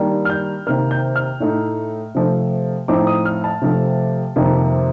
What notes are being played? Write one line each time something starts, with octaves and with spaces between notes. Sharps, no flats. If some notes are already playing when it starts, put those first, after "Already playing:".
Already playing: D#3 G3 A#3 D4
F6
G6
C3 D#3 A#3 F6
G6
F6
A2 A3 D#4
C3 F3 A3
A2 F3 C4 D#4 D6
D#6
F6
A5
C3 F3 A3
F2 C3 D#3 A#3